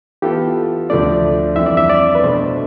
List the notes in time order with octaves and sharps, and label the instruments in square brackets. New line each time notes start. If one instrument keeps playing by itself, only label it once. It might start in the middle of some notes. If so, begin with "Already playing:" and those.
[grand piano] E3 B3 F4 A4 [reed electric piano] G4
[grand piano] D2 D3 F3 A3 D4 [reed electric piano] D5
[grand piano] F2 E3 G3 [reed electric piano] E5
[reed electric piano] D5
E5
D5
B4
[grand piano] B2 A3 D4 [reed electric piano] C5